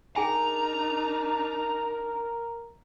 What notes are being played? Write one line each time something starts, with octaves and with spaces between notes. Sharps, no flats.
D4 D#4 G#4 A#4 G5 G#5 A#5